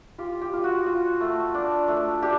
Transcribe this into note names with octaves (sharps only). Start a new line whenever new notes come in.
F4 G4
G4
F4
F#4
F4
A3
D4
A3
D4 G4